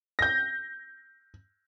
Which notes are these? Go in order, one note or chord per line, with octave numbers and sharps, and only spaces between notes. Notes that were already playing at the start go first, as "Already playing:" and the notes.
G6 A#6